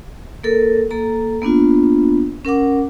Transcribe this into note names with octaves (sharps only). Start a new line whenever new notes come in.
A#3 A4 A#4
A#3 A4 A#5
A#3 B3 D4 F4
C#4 A#4 F#5 D6